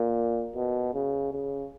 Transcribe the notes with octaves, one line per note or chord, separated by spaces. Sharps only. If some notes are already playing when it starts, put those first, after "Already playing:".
Already playing: A#2
B2
C#3
C#3